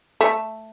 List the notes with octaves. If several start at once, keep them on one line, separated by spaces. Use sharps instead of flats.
A3